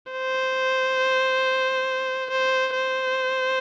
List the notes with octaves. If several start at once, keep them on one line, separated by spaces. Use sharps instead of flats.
C5
C5
C5